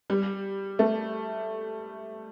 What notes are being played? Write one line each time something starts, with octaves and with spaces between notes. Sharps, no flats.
G3
A3